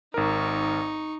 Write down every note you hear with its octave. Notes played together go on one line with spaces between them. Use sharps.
G#1 D#4 A#4 C#6